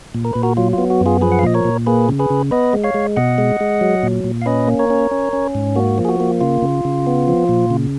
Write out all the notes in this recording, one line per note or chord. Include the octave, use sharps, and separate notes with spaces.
A#2
A#4
A#2 B4
F#4 A#4
F#3 F4
B3 F4
F#4
F#2
F4 G#4
F3 G#4 B4
F#5
F5
A#2 D#5
A#4 C#5
A#2
A#3 G#4 B4
C#3
G#4 B4
C#3
B3 B4 D#5
G#3
C#5 F5
G#3
B2 D#5 F#5
G#3
G#3
F#3
A#2
A#2
F5
C#4 B4 D#5
A#3
A#4 C#5
C#4
C#4
C#4
G#2
A#3 F#4
F3
G#4
F#4
A#3
C#3 F4
C#3
C#3
B3
F3
A#2
C#3